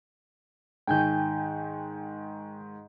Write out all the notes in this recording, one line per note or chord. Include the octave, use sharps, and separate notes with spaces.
G#2 D#3 G5 G#5 G6